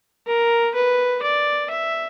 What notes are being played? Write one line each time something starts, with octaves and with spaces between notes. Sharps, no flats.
A#4
B4
D5
E5